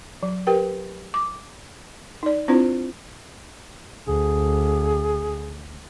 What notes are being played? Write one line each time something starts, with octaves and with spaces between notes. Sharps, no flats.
F#3
G4 A#4 B4 G5
D6
D#4 D5
C4 D4 E4 F4 C5
D2 G#4